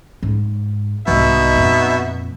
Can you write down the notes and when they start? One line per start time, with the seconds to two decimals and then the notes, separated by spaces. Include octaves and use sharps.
0.23 G#2
1.08 C2 G#2 B2 D#4 E5
1.55 F2 A#2